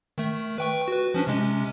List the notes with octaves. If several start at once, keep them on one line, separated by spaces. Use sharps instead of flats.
D#3 A3
B4 G5 C#6
F#4 B4
F3 C#4 D4
C3 G#3 C#4